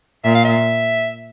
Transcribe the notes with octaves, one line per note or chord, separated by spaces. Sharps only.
A#2 E5
F5
E5